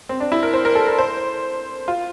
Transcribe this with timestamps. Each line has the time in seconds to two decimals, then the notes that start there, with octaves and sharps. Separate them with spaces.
0.09 C4
0.20 D4
0.32 E4
0.43 A#4
0.54 C5
0.65 A#4
0.75 A4
0.87 A#4
0.98 C5
1.88 F4